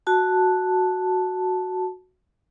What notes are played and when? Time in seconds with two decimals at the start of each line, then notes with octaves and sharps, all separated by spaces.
0.07 F#4 A5